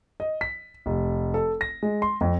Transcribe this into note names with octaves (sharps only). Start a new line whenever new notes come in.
D#5
B6
F1
A4
A#6
G#3
C6
F2